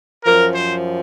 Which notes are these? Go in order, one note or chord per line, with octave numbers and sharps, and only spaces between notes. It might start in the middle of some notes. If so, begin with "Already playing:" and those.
F#2 F3 A#4
C5